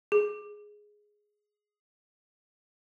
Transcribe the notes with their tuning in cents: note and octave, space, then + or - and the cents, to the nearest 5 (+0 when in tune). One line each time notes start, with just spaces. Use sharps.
G#4 +5